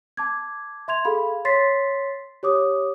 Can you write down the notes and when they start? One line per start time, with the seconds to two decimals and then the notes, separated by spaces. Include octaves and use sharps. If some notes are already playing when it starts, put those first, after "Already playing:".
0.17 A5 D6 G#6
0.88 E5 C6 G#6 F7
1.05 G#4 A4 F5 B5
1.45 C#5 C6 A6 B6 C7
2.43 G4 C#5 D6 D#6